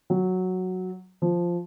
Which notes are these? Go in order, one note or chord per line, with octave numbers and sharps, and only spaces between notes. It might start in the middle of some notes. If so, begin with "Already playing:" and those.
F#3
F3